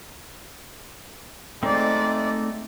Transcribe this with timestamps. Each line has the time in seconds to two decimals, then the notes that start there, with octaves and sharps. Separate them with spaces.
1.63 G#3 A3 C4 D#4 D5